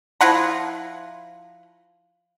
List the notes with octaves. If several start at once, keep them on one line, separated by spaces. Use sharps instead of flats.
F3 E4 F#5 A#5